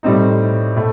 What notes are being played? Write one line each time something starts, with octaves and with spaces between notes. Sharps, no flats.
A2 G3 C4 D#4
A2 A3